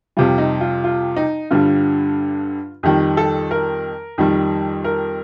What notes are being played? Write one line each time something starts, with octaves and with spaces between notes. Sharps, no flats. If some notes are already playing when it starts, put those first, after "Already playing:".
F2 C3 G3 F4
D#4
F4
F4
D#4
G2 D3 G3 F4
F2 D#3 G3 G4
A4
A#4
F2 D#3 G3
A#4